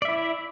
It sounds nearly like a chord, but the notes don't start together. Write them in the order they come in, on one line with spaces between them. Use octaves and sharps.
D5 E5 E4